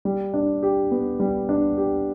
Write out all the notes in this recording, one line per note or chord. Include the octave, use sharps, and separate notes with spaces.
G3
D4
G4
B3
G3
D4
G4